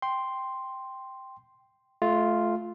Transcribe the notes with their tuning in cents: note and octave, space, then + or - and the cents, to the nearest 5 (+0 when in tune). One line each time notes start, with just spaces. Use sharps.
G5 +0 C6 +0
A3 -25 F4 +0